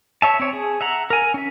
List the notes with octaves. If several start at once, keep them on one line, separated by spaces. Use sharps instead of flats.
C#5 E5 A5
C4 C#5
G#4
E5 F#5 A#5
A#4 G#5
C#4 E5